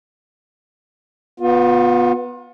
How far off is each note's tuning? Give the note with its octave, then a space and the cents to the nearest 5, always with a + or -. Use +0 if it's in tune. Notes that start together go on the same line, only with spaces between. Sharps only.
B3 -5 F4 +35